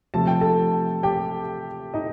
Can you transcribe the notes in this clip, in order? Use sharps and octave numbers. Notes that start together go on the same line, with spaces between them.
C3 F3 A3 A5
G5
A4 A5
G4 G5
D#4 D#5